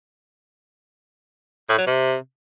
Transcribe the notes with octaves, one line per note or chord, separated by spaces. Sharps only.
A2
F#3
C3